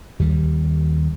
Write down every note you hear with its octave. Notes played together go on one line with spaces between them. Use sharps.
D#2 G3